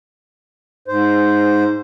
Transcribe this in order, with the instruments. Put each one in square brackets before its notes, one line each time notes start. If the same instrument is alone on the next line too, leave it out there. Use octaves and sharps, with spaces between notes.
[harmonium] G#2 C5